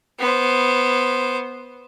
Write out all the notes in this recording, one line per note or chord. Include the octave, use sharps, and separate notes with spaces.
B3 C5